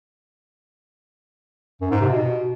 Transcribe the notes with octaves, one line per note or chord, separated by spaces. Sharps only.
F#2
G#2
C3
B2